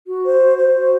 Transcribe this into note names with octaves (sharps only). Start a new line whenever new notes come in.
F#4
C5
F#4
C5
F#4